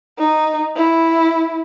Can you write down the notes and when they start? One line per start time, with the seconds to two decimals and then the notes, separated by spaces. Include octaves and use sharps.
0.19 D#4
0.76 E4